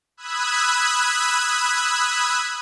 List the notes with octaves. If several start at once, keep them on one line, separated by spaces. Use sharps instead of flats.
B5 D#6 E6 F#6 G#6